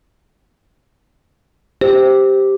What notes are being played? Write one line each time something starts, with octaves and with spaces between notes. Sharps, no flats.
G4 C5